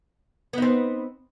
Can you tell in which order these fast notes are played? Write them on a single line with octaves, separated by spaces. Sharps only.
B3 D#4 C4